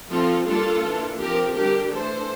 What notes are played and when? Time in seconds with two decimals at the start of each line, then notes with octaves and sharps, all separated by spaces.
0.11 F3 C4 F4 A4
0.47 G3 A#3 D4 F4 A4
0.83 E3 A#3 D4
1.19 F3 C4 G4 A#4
1.55 D3 G3 D4 G4 A#4
1.92 E3 A3 D4 A4 C5